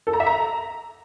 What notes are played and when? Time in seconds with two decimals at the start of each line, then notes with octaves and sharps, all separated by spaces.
0.07 A4
0.13 A#5
0.20 E5
0.27 A#5